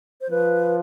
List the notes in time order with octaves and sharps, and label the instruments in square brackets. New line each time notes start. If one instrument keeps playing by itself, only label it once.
[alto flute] C5
[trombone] F3 [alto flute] B4